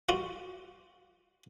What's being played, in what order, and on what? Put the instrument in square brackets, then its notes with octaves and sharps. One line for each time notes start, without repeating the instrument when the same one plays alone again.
[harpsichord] F4 F#4 F5